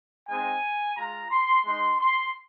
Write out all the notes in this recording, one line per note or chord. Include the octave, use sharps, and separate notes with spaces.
G#3 C4 D#4 G#5
G#3 F4 A#5
C6
G#3 D#4 C6
C6